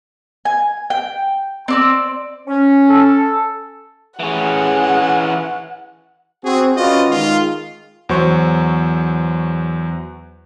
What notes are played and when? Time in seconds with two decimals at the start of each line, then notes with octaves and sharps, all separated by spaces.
0.45 G#5
0.90 G5
1.68 C4 D5 E6
2.47 C#4
2.89 A4
4.20 E3 C#4 G#4 F#5
6.44 C4 F#4 G#4
6.77 C#4 F4 F#4 B4 D5 D#5
7.09 D#3 G#3 F4
8.09 E2 F#3 C5 C#6